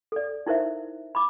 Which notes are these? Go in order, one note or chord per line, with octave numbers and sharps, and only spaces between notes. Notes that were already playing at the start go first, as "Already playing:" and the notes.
A4 D5
D#4 E4 A#4 C5 E5
B5 D6